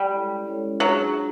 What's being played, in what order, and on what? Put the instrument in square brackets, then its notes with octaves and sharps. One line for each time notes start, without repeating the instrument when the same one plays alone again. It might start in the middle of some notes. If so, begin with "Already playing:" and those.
Already playing: [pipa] G3
[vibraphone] G#3 C#4 E4 A4 C#5
G#3 C#4 E4 A4 C#5
[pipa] F#3 [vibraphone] D4 F4 G#4
[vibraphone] F4 G#4